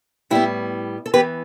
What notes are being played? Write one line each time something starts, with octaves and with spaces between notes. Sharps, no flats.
A2 G3 B3 E4 G4
A4
E3 B3 G4 B4